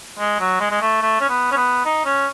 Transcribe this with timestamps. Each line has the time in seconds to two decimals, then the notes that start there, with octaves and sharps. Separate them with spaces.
0.19 G#3
0.40 F#3
0.60 G#3
0.71 G#3
0.81 A3
1.02 A3
1.20 C#4
1.29 B3
1.51 C#4
1.57 B3
1.85 D#4
2.05 C#4